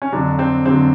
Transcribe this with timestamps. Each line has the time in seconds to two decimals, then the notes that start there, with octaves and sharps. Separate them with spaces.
0.02 C#4
0.12 F2 D3 F#3 D4
0.39 C4
0.65 F2 D3 F#3 C4